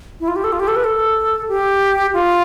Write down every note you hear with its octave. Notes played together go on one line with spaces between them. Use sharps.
E4
F4
G4
A4
F4
G4
A4
B4
A4
G4
F4